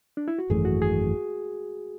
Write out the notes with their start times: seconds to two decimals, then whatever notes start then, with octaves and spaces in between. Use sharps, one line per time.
0.17 D4
0.28 E4
0.39 F#4
0.50 G#1 F#2 E3 A3 G#4
0.65 F#4
0.82 G#4